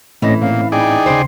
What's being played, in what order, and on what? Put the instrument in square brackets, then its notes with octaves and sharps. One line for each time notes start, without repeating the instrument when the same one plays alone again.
[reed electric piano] A2 C4 C#4 [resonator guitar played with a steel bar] E3 [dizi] D#5
[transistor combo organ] A#2 [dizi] F5
[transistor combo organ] D#4 G#4 D5 [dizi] G5
[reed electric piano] D#2 C#3 [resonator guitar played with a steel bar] C5